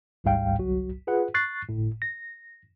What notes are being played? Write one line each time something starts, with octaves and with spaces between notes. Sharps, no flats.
A1 D2 G#2 G3 F5 G5
G1 C2 F#3 F#4
F4 G#4 B4 F#5
C#6 F#6 A6 C7
G1 A2
A#6